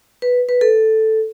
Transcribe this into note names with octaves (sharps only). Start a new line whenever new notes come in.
B4
B4
A4